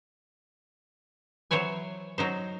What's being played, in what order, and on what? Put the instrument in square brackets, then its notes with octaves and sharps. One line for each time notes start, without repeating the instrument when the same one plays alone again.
[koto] E3 F#3 C5 C#5 G#5
F#3 D#4 C5